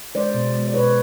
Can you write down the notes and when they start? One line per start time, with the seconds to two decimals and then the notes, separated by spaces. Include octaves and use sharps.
0.15 G#3 C5 D5
0.34 B2
0.55 G#3
0.68 D5
0.74 B2 B4 C#5